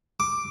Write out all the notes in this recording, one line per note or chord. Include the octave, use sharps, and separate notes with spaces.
D6